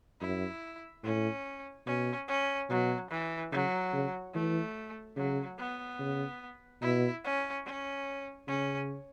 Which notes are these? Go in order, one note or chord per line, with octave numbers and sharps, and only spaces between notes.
F#2 E4
A2 C#4
B2 C#4
C#4
B2 F#3
E3
C#3 F#3
C#3
E3 A3
C#3 F#3
B3
C#3
B2 E4
C#4
C#4
C#3 C#4